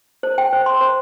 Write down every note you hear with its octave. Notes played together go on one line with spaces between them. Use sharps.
C5
G5
C5
C6
C5